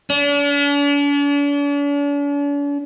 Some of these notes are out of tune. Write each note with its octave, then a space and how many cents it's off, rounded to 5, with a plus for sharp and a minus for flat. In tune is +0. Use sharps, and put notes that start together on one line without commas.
D4 -45